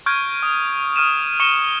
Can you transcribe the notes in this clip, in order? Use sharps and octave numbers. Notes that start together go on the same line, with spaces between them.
C#6 F6 G6 G#6 D7
D#6
D#6 F6 D#7 E7
C#6 C#7 D#7 E7 G7